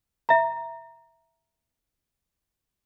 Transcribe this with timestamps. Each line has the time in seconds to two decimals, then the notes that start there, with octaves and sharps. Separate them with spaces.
0.29 E5 A#5